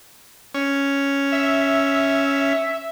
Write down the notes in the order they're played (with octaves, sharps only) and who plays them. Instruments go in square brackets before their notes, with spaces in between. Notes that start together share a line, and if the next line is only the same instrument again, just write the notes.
[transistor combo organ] C#4
[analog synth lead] E5